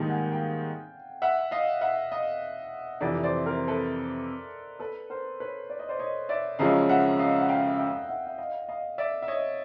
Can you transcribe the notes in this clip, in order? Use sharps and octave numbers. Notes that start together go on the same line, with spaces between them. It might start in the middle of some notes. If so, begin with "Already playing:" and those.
Already playing: G#2 D#3 G3 A#3 D#4 G5 A5
F#5 G#5
F5 G5
E5 F#5
D#5 F5
E5 F#5
D#5 F5
F2 C3 E3 D5 E5
C5 D5
A#4 C5
A4 B4
A4 B4
A#4 C5
B4 C#5
D5
D#5
C5 D5
C#5 D#5
D5 E5
F#2 C#3 F3 G#3 C#4 D#5 F5
E5 F#5
D#5 F5
F#5
F5 G5
F5 G5
E5 F#5
E5
D#5 F5
D#5 F5
D5 E5
E5
C#5 D#5